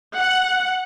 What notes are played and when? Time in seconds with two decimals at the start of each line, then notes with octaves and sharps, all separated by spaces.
0.16 F#5